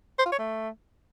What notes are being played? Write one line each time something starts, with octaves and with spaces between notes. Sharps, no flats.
C5
F4
C#5
A3